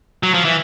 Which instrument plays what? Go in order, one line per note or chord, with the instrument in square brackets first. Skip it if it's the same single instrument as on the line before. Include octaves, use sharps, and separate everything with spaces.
[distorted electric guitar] F#3
F3
E3